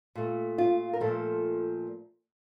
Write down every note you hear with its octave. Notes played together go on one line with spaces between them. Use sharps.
A#2 A3
F4
A#4
A#2 F3 A3 A4